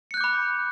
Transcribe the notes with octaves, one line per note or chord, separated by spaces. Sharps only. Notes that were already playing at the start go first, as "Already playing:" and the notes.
B5 D6 F#6 G6 C#7